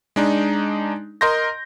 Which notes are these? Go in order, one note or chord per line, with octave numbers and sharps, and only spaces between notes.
G#3 D4 D#4
A#4 D#5 C6 G6 A#6